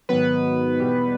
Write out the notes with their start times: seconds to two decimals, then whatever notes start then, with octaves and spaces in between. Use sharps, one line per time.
0.09 G#2 D#3 F#3 B3 B4
0.80 E2 B2 G3